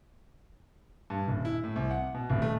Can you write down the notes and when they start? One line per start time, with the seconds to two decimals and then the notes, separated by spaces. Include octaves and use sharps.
1.10 G2
1.28 D#1
1.45 E4
1.64 A2
1.76 C2
1.91 F#5
2.15 B2
2.30 D#1
2.42 A3